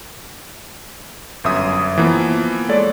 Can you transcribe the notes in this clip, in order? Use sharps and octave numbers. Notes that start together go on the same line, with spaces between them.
G1 F#2 E5 D#6
E3 F3 A#3 B3
G#3 A4 C#5 D5